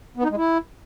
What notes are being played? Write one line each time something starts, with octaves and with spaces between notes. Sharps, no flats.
B3
D#4
G#3
E4